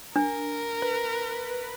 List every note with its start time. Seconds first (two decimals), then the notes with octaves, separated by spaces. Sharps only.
0.16 D4 A#4
0.82 B4